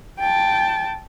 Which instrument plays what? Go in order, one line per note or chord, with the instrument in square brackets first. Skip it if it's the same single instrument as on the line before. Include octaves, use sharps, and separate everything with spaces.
[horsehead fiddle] G5 A5